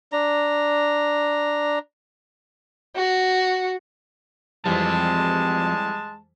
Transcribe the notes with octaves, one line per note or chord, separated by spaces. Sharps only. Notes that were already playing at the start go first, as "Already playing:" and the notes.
D4 A#5
F#4
F2 E3 F3 G3 G#3 C4 A5